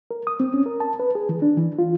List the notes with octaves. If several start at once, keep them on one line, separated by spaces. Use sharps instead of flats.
A#4
D#6
C4
C#4
A#4
A5
B4
G#4
E3
D4
E3
F4